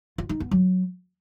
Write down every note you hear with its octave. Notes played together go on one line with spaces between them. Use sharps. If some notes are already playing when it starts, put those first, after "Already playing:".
F4
D#4
B3
F#3